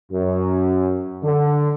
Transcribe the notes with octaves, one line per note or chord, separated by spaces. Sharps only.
F#2
D3